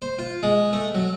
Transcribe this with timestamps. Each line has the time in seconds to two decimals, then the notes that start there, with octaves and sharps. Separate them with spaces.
0.02 C5
0.19 F4
0.43 G#3
0.73 A3
0.95 F#3